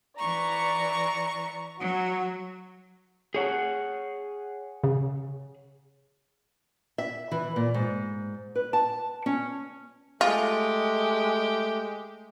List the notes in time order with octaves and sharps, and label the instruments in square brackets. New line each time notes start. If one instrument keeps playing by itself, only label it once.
[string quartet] E3 C#6 [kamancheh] D5 A#5
[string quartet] F#3 [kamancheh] F#4
[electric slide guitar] G#4 C#5 F#5
[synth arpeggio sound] C#3
[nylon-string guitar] E5
E3
A#2
G#2
B4
A5
C#4
[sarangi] G#3 [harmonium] A3 [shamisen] F4 [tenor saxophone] G4